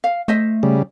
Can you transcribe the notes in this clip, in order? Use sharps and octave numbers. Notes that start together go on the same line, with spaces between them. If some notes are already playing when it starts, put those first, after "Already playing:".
F5
A3 C5 D#5 E5
C#3 G3